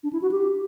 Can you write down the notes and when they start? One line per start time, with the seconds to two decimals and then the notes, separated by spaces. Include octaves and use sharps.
0.03 D4
0.13 E4
0.22 F#4
0.31 G4